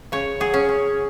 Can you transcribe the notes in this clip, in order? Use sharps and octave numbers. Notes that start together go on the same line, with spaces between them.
C#3 C#5
F#3 G#4
C#4
C#4